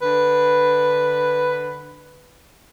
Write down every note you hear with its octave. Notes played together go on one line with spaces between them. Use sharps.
D3 B4